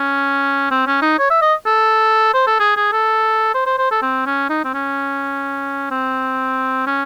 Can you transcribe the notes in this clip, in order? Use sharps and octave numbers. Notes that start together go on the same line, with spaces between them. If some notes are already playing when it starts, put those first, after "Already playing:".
Already playing: C#4
C4
C#4
D#4
C#5
E5
D#5
A4
C5
A4
G#4
G#4
A4
C5
C5
C5
A4
C4
C#4
D#4
C4
C#4
C4
C#4